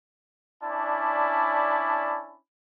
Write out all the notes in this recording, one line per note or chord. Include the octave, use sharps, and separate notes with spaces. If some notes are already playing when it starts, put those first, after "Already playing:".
C#4 D4 E4 D5 A5 B5